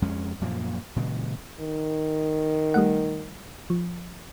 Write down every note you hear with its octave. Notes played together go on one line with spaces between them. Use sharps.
F2 G#3 C#4
F#2 A#2 F3 A#3
A#2 C#3 E3 G#3
D#3
G3 A3 F#5
F3